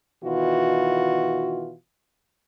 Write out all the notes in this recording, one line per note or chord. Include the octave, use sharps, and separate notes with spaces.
B2 D#3 E3 F4 F#4